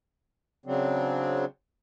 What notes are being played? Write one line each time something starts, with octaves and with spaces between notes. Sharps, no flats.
C#3 F#3 C4 D4